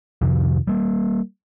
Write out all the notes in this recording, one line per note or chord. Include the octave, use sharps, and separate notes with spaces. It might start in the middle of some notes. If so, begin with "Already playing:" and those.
F2 C3 D#3 F3
G3 A#3